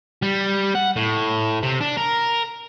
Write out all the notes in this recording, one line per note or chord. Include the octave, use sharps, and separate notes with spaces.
G3
F#5
A2
C3
D4
A#4